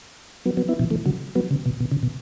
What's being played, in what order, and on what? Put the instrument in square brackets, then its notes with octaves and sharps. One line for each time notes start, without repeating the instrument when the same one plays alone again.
[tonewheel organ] F#3 B3
F#3 B3
B3 E4
B2 E3
E3 A3
C#3 F#3
F#3 B3
C#3
B2
B2
C#3
B2